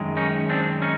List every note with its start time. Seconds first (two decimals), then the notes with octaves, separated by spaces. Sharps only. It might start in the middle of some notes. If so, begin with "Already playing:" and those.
Already playing: F#2 D#3 G#3
0.17 C#4 D#4
0.50 C4 D4
0.82 C#4 D#4